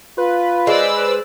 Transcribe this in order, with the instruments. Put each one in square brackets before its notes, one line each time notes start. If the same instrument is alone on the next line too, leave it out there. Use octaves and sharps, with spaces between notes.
[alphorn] F4 [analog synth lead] B4
[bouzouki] G#3 [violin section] C5 D5 E6